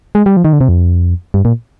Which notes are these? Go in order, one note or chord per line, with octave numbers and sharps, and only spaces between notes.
G#3
G3
F3
D#3
D3
C3
F2
G2
A#2